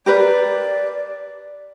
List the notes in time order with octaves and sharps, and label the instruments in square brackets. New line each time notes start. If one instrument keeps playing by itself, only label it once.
[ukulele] G4 A#4 B4 [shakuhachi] D5